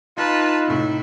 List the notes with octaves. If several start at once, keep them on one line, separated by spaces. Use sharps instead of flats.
D#4 F4 B4 A5
A2 C3 E5